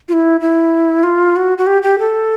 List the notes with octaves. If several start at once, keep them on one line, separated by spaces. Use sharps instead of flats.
F4
E4
E4
F4
F#4
F#4
G4
G4
A4